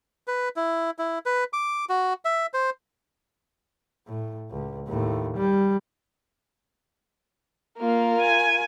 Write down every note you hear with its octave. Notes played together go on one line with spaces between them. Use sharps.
B4
E4
E4
B4
D6
F#4
E5
C5
A2
C#2
D#2 A2
G3
A#3 F4 A#4
G#5